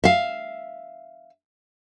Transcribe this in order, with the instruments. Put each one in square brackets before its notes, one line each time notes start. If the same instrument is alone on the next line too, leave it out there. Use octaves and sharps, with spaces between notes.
[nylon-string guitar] E5 F5